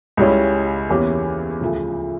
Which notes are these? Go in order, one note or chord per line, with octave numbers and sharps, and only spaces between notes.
C#2 C#3 G3 C#4 E4
E2 E3 A#3 C#4 G4
D2 C#3 F3